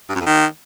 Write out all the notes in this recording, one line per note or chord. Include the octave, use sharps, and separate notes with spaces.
G2
F#2
F2
D#3